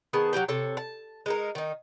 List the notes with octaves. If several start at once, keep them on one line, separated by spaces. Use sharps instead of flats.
D#3 B3 G#4 A5
F#3 G3 G4 G5
C3 A4 C#5
A5
G#3 D#4 A#4
D#3 D#4